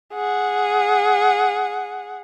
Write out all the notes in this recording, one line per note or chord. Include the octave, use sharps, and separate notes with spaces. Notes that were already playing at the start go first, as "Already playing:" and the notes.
G#4 F#5